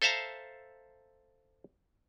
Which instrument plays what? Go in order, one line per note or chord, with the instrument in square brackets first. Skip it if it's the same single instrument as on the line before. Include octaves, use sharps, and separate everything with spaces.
[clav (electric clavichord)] A4 C5 E5 F5 A5 A#5